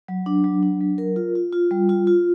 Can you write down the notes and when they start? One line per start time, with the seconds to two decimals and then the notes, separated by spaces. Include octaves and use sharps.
0.08 F#3
0.26 D4
0.44 F#3
0.63 D4
0.81 F#3
0.98 A#4
1.16 F4
1.35 F4
1.53 F4
1.71 G3
1.89 F4
2.07 F4